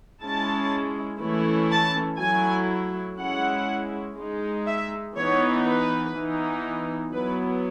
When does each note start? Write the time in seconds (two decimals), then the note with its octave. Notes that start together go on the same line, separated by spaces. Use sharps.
0.23 G#3 C#4 E4 A5
1.22 E3 A3 C#4 E4
1.71 A5
2.19 F#3 A3 E4 G#5
3.18 G#3 C#4 E4 F#5
4.17 G#3 D#4
4.66 E5
5.16 E3 B3 D#4 C#5
5.66 B4
6.15 E3 B3 D#4
7.13 F#3 B3 E4 B4